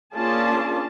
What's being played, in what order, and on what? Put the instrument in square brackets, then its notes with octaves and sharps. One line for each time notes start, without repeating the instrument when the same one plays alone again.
[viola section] A#3 C#4 D4 F4 G#4 A5